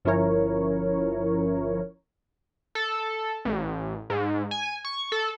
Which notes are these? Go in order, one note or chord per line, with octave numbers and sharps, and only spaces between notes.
G1 F3 C#4 E4 A#4 C#5
A4
A1
G#2
G#5
C#6
A4